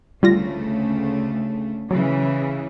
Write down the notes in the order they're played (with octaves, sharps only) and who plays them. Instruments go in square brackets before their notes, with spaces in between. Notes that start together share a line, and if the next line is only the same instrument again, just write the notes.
[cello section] D2 C#3 A3 [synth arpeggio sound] G3 F4 A#6
[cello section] C#3 E3 [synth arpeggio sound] F#3